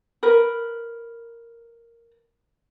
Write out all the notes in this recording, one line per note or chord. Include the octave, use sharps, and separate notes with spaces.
A#4 B4